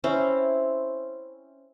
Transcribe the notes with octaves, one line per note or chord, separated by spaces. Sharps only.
C4 C#4 E4 C5